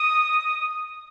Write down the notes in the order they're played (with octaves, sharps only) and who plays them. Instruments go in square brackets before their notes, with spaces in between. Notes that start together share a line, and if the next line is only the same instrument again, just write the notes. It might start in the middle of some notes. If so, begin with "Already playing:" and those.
Already playing: [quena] D#6